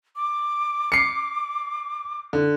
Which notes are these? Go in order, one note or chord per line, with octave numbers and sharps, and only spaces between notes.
D6
C7 C#7
D3